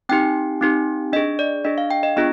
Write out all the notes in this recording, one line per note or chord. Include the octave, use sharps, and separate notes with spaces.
C4 D#4 G4 G5
C4 D#4 G4
D4 G#4 D#5
D5
D4 G#4 D#5
F5
G5
D#5
B3 D4 F4 G#4 D#5